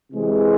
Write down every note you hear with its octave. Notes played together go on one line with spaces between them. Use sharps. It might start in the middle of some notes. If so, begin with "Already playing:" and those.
C3 E3 G#3